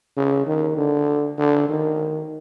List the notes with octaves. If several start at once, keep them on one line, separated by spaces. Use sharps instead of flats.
C#3
D#3
D3
D3
D#3